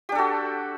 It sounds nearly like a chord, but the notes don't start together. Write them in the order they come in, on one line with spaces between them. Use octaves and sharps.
G4 D4 A4 F#4